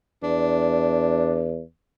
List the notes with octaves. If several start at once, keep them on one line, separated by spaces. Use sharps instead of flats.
E2 D4